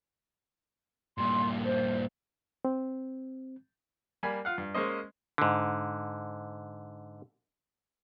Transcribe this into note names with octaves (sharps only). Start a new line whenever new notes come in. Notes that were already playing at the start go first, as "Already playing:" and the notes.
G2 A#2 C6
C5
C4
G3 A#3 G#5 B5
F4 F5 F#5
G2
G#3 A#3 C#4 C5 D#5
G#2 D3